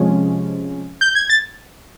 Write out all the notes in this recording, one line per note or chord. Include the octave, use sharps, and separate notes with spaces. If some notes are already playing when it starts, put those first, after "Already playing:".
Already playing: C3 F3 G#3 C#4
G6
G#6
A6